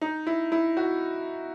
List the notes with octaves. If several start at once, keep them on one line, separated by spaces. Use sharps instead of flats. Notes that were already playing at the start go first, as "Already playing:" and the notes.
D#4
E4
E4
F#4